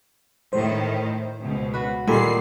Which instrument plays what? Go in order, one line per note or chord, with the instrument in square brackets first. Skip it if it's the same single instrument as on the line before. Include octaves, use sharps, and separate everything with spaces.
[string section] A2 D#3 [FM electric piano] C5
[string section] C#2 B2
[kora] F#4 B4
[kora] A#2 [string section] D#3 C7 [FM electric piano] G3 A4 B5